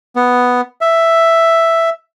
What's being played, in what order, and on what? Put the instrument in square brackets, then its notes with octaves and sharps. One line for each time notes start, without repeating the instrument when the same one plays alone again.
[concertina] B3
E5